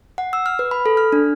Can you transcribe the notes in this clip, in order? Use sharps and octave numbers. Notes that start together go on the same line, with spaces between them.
F#5
E6
F6
B4
B5
A4
F6
D4